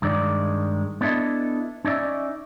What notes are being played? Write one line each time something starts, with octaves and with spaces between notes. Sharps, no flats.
G2 D#3 G#3 D5
B3 D4 E4 A4 D#5
C#4 D#4 D5 E5